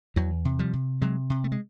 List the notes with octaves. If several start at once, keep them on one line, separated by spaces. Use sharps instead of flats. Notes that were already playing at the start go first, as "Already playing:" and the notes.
E2 E3 F#3
C3
F3 G3
C3
C3 F#3 G#3
C3
A3
G#3